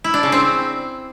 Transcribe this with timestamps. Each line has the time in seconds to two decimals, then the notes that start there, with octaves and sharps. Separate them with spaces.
0.04 E4
0.14 D4
0.23 C#3
0.32 C4